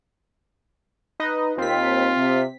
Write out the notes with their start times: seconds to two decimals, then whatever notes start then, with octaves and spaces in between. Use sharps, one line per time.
1.20 D#4 B4 D#5
1.58 D#2 C4 F4 B6
2.16 C3